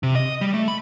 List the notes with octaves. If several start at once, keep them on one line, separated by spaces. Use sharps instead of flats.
C3
D#5
G3
A3
B5